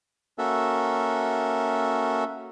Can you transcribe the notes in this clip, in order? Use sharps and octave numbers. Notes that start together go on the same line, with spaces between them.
A#3 C#4 F#4 A4 E5